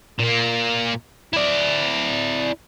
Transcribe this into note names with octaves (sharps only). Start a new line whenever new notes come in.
A#2 A#3
E4 D5